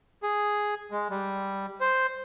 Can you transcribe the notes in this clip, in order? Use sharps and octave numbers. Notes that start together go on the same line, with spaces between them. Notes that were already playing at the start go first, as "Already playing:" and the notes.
G#4
G#3
G3
C5